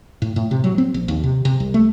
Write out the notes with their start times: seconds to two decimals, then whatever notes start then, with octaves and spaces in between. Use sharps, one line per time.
0.22 A2
0.36 A2
0.51 C3
0.64 F#3
0.78 C4
0.94 A#1
1.08 D#2
1.24 C3
1.45 C3
1.60 C2
1.74 A3